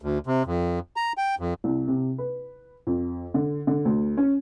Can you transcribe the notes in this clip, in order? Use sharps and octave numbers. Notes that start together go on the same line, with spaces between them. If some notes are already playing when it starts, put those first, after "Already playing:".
D2
C3
F2
A#5
G5
F2
C2
C3
B4
F2
D3
D3
D2
C#4